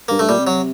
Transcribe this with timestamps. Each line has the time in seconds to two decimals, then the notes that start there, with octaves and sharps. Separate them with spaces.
0.08 G2 A#3
0.19 G2 A3
0.29 A#2 G3
0.38 C3
0.47 F#3